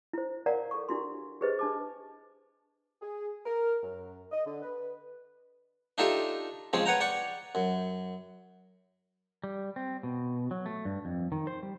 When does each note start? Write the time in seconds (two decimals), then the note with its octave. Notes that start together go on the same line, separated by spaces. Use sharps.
0.13 E4 C5
0.46 A#4 C#5 D5 F5 F#5 A#5
0.71 A4 C#6
0.89 D4 E4 F#4 G4 C6
1.41 G4 G#4 B4 C5 D#5
1.59 D4 A5 D6
3.02 G#4
3.45 A#4
3.83 F#2
4.32 D#5
4.45 D3
4.62 B4
5.98 D4 D#4 F4 G4 A4 E5
6.73 C#3 F3 G#3 C4 C#4
6.86 B4 C#5 F#5 G5 A#5
7.01 D5 F#5 G5 C#6
7.55 F#2
9.44 G3
9.76 C4
10.03 B2
10.51 F#3
10.66 A3
10.85 G2
11.05 F2
11.32 D#3
11.47 C5
11.63 G3